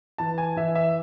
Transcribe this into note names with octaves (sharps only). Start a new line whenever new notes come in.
E3 A5
G#5
E3 E5
E5